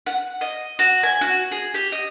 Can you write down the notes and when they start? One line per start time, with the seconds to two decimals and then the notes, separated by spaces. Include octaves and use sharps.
0.06 F#5
0.41 D#5
0.79 F#4
1.03 G#5
1.21 F#4
1.51 G#4
1.74 G4
1.92 D#5